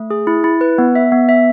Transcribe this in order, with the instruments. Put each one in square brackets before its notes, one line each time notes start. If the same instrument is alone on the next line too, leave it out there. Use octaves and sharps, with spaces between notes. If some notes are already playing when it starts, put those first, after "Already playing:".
Already playing: [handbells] A3
G#4
E4
E4
B4
B3
E5
B3
E5